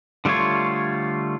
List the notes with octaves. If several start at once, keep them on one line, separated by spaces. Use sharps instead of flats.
D3 G3 A3 F4 C#5